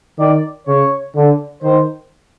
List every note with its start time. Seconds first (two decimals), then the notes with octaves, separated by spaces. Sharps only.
0.18 D#3 D5
0.66 C#3 C#5
1.15 D3
1.62 D#3 C5